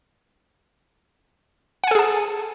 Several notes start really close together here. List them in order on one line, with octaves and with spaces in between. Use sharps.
F#5 G#5 A4 G#4 A5